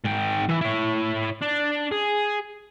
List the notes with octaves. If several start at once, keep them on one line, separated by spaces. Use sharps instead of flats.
G#2 G5
E3 E5
E4 C#5
D4
G#4